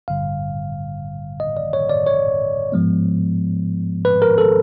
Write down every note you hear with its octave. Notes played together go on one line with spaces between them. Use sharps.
G#1 G2 D3 G3 F5
D#5
D5
C#5
D5
C#5
G#2 F3 G#3 B3
B4
A#4
A4